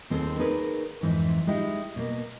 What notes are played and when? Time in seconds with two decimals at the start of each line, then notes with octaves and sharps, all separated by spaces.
0.10 D#2 C4 G#4 A4 C5
0.39 D#4 G#4 A#4 B4 C#5 D5
1.01 F2 G#2 E3 C4
1.47 G#3 D#4 E4 G4
1.96 B2 A#3